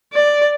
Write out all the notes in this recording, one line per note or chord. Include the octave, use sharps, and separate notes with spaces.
D5